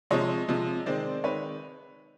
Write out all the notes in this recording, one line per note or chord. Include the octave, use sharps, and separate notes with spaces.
C3 F3 G#3 C#5 D#5
C3 F3 G#3
D#3 G#3 C4 C5 D5
D#3 G#3 C4 B4 C#5